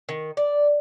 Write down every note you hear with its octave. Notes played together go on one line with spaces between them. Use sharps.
D#3
D5